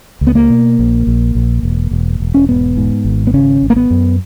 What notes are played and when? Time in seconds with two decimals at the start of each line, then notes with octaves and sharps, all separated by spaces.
0.21 C#2
0.27 B3
0.35 A#3
0.50 B2
0.79 A#1
1.07 A#1
1.35 A#1
1.63 E1
1.91 E1
2.20 E1
2.34 C#4
2.49 G#2 B3
2.77 G#2
3.05 G#1
3.27 B3
3.34 C#3 C#4
3.62 G#1
3.70 A#3
3.76 B3
3.91 F#2